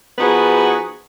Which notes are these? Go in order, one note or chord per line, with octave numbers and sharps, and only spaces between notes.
F3 B3 D#4 F#4 G#4 B4